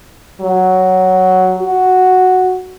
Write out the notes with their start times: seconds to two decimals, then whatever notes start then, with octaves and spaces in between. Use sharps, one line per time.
0.41 F#3
1.59 F#4